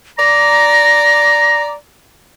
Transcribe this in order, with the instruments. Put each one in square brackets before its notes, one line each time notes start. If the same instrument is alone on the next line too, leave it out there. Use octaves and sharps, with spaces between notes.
[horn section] D5 A#5 [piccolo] A#6